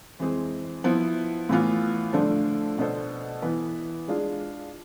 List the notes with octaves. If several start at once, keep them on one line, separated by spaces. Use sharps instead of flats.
F2 E3 G#3 C4 G#4
F3 B3 E4
A2 E3 B3 F4
D3 F3 A3 D4 F4
B2 B3 D4 A4 C5
E3 B3 E4 B4
G#3 D4 F4 G#4